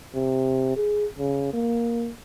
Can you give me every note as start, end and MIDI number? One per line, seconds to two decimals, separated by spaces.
0.14 0.74 48
0.77 1.06 68
1.18 1.51 49
1.53 2.11 58